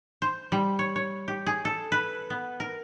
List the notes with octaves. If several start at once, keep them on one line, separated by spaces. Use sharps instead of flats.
C5
G3
C#5
C#5
G4
G#4
A4
B4
B3
A#4